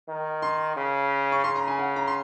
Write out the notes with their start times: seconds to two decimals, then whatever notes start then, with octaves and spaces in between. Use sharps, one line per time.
0.09 D#3
0.42 C6
0.76 C#3
1.32 C#6
1.44 C#3 C6
1.56 A#5
1.67 G#5
1.79 F#5
1.96 A#5
2.07 C6